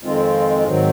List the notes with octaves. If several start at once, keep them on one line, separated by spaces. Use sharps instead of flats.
F2 D#3 G#3 C4 F4
G#2 D#3 F#3 C4